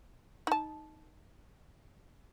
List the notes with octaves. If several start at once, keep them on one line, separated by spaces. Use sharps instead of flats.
D#4 A5